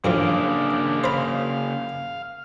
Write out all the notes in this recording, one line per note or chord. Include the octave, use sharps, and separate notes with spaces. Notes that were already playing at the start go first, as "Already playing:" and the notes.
F#2 A2 C#3 F3 A#3 D4
C5 F5 B5